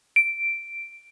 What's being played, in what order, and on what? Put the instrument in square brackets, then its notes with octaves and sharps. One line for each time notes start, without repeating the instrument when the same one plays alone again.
[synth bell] D7